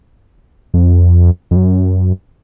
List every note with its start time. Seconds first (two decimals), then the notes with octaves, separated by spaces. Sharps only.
0.74 F2
1.51 F2
1.56 F#2